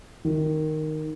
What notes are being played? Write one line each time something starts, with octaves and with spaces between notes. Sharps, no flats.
D#3